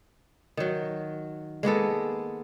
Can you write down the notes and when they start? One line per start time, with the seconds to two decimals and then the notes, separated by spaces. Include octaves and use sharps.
0.57 D#3 F#3
1.63 G#3 A#3 B3 A4